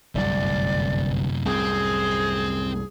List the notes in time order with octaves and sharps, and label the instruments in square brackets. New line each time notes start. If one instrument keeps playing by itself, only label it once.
[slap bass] G1 C2 [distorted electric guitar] F#2 C3 [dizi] D5
[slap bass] C2 F#2 A2 [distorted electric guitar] C4 [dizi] G#4